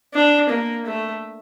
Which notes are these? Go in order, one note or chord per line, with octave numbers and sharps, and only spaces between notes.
D4
A#3
A3